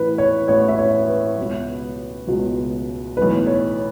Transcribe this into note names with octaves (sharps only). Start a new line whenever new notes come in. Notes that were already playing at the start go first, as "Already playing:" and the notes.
Already playing: A1 A2 E3 B4
C#5
A1 A2 E3 C#5
E5
C#5
B4
C#2 B2 F#3
C#2 B2 F#3
B1 A2 E3 B4
C#5